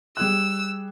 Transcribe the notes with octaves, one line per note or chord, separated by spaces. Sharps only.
G3 G#4 E6 F#6